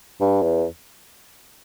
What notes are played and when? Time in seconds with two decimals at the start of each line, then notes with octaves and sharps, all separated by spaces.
0.21 G2
0.42 E2